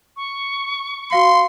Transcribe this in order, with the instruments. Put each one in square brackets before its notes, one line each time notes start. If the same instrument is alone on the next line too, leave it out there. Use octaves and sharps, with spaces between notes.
[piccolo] C#6
[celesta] F#4 F5 C#7 [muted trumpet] C6